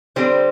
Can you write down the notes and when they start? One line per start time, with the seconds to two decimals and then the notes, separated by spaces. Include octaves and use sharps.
0.16 D3 G3 C4 C5